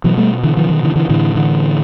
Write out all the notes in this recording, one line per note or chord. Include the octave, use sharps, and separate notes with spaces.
B2 E3 F#3
G3 A3
D3 E3
D#3 F3
D#3
D3 E3
D3 E3
A2 D3 E3
D3 E3